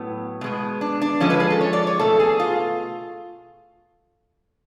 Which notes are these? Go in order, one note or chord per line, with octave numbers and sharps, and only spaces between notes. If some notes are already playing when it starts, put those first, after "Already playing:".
Already playing: A2 F#3 B3
B2 G#3 B3
D4
D4
D3 F3 G#3 C#4
B4
G#4
A4
C#5
D5
C#5
B2 A3 A4
G#4
F4